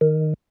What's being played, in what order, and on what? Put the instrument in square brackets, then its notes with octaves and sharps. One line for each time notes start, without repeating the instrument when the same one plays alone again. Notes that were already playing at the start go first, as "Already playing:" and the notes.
[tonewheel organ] D#3